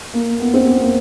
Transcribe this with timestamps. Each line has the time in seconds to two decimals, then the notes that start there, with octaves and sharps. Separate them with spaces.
0.14 A#3
0.40 B3
0.54 C4
0.67 B3
0.80 A#3